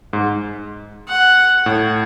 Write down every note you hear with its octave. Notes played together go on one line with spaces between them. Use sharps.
G#2
F#5
A2